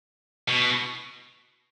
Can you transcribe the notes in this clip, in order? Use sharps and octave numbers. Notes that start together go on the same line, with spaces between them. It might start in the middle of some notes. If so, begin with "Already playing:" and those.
B2